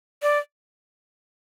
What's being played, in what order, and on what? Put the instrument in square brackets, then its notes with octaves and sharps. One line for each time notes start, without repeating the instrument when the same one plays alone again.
[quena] D5